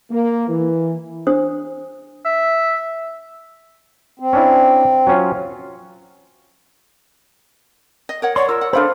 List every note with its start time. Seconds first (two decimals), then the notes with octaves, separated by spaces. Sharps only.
0.10 A#3
0.48 E3
1.27 D4 C5 D#6
2.25 E5
4.20 C4
4.33 C#4 D4 E4
5.07 F#3 C#4 F4
8.09 D#5
8.22 A#4 C#5 F#5
8.36 C#5 D5 C6
8.49 F4 A#4 E6
8.61 F#5
8.73 D4 A4 A#4 C5 F5 B5